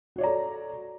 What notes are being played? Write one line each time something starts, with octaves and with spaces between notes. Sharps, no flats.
F#4 A4 C#5 D5 A#5